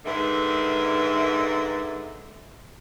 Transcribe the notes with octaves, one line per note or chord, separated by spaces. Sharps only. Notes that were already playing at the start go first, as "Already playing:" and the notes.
G#2 D3 D#3 B4 E5